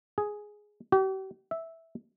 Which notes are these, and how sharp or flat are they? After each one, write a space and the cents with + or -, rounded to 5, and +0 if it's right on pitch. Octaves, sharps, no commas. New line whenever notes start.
G#4 +5
G4 -45
E5 -5